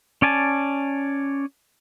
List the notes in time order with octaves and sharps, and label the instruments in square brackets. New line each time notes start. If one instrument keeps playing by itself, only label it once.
[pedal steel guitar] C#4 D5 G#5 A5